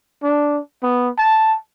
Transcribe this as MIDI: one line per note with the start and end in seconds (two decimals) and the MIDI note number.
0.23 0.59 62
0.83 1.10 59
1.18 1.55 81